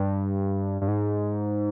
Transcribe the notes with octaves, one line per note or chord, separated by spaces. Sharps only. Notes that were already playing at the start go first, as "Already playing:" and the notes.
Already playing: G2
G2
G#2